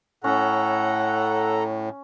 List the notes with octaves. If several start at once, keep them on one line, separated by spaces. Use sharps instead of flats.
A2 C#4 A4 F#5 A#5